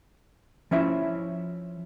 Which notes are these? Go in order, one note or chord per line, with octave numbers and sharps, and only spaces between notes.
F3 C#4 E4 E5